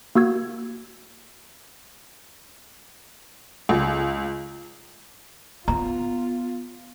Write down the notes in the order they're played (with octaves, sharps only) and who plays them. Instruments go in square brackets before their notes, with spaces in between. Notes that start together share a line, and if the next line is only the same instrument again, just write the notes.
[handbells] A#3 F#4 E6 G#6
[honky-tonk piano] C#2
[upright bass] B3 [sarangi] F4 [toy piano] A#5